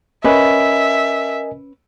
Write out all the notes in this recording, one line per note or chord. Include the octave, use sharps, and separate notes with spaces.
C#4 A#4 B4 D#5 E5 G#5